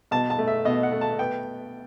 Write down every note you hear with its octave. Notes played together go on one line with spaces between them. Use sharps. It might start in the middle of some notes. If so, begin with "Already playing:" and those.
B2 A5
A5
A3
E5
B2 D#5
F#5
A3
A5
B3 G5